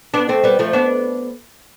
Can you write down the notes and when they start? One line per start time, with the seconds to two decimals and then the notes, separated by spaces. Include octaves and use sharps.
0.14 B3 D4
0.29 A3 C4
0.43 G3 B3
0.59 F3 A3
0.73 B3 D4